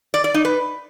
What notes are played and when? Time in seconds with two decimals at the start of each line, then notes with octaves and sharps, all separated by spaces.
0.14 D5
0.24 D5
0.34 D#4
0.45 B4